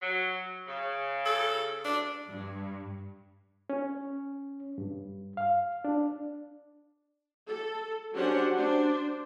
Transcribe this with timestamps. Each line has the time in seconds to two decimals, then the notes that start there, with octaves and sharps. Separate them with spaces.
0.02 F#3
0.67 C#3
1.26 A4
1.85 D4
2.28 G2
3.70 C#4
4.78 G2
5.37 F5
5.84 D4
7.47 A4
8.13 F#3 C#4 D4 G4 C5 F#5
8.57 D4 C5